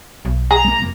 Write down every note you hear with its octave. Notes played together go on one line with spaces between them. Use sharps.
B1
G#4 A#5
G#3 A#3
F1 A#3